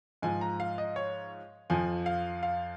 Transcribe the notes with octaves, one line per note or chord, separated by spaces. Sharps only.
G#2 F3 G#5
A#5
F5
D#5
C#5
F2 F3 G#5
F5
F5